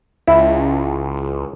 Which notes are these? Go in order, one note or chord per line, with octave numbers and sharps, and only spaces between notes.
C#2 E4